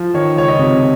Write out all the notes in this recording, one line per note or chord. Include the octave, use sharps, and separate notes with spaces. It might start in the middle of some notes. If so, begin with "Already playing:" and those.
Already playing: F3
D#3 C#5
C#2 C#5
D#5
C3